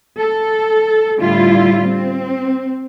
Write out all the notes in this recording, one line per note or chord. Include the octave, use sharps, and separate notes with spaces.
A4
A2 D3 G3 E4 F4
C4